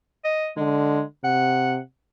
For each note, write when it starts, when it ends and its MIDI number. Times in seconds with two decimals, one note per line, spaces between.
0.24 0.48 75
0.57 1.02 50
0.57 1.02 56
1.24 1.80 48
1.24 1.76 78